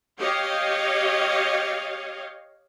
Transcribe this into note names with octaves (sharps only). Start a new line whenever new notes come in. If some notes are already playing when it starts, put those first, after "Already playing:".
G4 C#5 D#5 F5